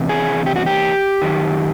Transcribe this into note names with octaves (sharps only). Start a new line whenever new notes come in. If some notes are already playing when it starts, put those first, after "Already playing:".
Already playing: E2 C3
G#4
G4
F#4
G4
F#2 D#3